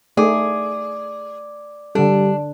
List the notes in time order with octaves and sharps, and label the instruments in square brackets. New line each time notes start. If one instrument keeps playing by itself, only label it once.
[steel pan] A3 D#4 [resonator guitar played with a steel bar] G#4 [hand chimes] D5 D6
[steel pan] D3 A4 [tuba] G3 [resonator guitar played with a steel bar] D4